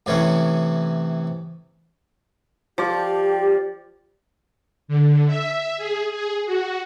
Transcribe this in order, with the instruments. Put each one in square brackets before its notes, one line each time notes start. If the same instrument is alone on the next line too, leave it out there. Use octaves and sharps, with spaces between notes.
[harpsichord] A2 C3 E3 C#4
[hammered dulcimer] F3 D5 [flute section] G4
[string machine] D3
E5
G#4
G#4
F#4